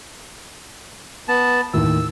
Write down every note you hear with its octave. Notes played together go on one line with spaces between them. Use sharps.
B3 A5
D#2 A2 E6